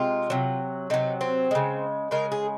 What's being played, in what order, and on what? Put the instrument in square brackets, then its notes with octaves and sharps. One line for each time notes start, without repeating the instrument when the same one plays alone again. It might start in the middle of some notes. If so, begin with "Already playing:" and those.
Already playing: [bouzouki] C3 G#3 F4
C3 F#3
C3 F#3 D#4
C4
C#3 G#3
C#3 G#3 A#4
G#4